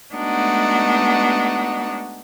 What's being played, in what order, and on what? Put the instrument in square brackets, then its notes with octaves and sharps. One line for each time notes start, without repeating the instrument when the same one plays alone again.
[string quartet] G#3 A3 B3 D4 D#4 F#4